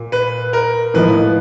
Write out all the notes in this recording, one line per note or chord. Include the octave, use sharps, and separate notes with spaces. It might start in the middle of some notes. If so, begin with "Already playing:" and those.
Already playing: A#2
B4
A#4
A2 F3 A#3 D#4 B4